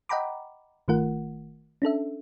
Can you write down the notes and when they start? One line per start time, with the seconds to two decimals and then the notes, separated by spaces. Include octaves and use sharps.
0.09 D#5 F#5 G5 A#5 B5 D6
0.88 G1 D#3 A3 F4 A#4 F#5
1.82 C#4 D4 A4 E5